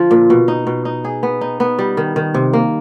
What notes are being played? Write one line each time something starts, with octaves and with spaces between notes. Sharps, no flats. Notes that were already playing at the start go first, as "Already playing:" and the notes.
Already playing: D3 F3
A#2
B2
D#4
B2
D#4
G#4
B3
D#4
B3
G3
D#3
D#3
C3
A#3